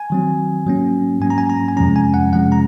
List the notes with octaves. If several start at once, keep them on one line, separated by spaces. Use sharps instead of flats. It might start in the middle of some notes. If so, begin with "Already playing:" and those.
Already playing: G#5
D#3 F#3 C4
G#2 F#3 A#3 C#4
G#2 F#3 A#3 C#4 G#5
A#5
G#5
A#5
G#5
F2 C3 F3 G#3 C#4 A#5
G#5
F#5
F2 C3 F3 G#3 C#4 F#5
A#5